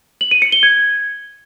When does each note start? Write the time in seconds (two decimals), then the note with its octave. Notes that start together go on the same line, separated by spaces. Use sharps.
0.21 F#7
0.31 D#7
0.42 C#7
0.52 G7
0.63 G#6